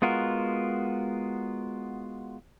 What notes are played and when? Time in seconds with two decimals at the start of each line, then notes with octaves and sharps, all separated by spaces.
0.02 G#3 B3 F4 F#4 A#4